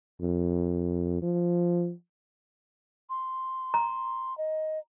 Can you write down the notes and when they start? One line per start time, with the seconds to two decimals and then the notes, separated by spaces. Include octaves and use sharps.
0.21 F2
1.22 F3
3.10 C6
3.74 A#5
4.38 D#5